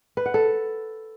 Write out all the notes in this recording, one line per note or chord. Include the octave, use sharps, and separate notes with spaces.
B4
F#5
A4